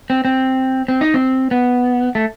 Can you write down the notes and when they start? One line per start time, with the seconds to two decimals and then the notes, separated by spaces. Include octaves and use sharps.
0.10 C4
0.25 C4
0.88 C4
1.01 D#4
1.14 C4
1.51 B3
2.15 A3